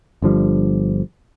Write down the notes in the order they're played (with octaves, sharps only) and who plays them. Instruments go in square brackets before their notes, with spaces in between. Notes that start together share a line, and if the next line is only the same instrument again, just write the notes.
[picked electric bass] G1 D3 F3 G3